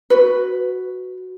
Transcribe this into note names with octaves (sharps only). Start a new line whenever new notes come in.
F#4 B4